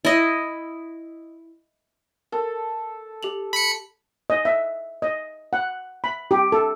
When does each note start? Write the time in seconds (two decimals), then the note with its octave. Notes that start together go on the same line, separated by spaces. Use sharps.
0.05 E4 D#5
2.32 A4 A#4
3.23 G4 F7 F#7
3.53 B5 C#7
4.30 D#5
4.45 E5
5.02 D#5
5.53 F#5
6.04 B5
6.31 G4
6.52 A4